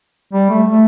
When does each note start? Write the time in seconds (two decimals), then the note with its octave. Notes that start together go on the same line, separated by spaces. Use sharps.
0.33 G3
0.50 A3
0.68 A3